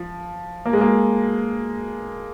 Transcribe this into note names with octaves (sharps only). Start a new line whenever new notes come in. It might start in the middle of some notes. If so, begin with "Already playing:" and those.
Already playing: F3
A#3
G#3
A#3